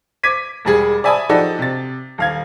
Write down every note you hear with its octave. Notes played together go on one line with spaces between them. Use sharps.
D6 G#6 B6 D#7
E1 G3 G#4
D5 E5 G#5 A5 B5 D#6
F3 D#4 F#4 G4 A4 D5
C3 A6
D#1 F5 G#6